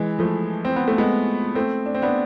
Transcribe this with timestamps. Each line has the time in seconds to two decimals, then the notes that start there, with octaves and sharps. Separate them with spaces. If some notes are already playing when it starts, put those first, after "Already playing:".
Already playing: E3 G#3
0.19 F3 A3
0.65 C4
0.76 B3
0.88 A3
0.98 G#3 B3
1.55 A3 C4
1.86 D4
1.95 C4
2.02 B3 D4